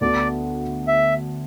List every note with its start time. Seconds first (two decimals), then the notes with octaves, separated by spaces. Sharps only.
0.01 D2 D3 B3 D4 F#4 D5
0.88 E5